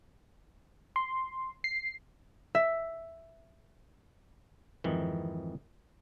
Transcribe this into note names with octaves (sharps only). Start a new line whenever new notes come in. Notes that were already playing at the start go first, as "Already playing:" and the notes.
C6
C7
E5
F2 G#2 D#3 E3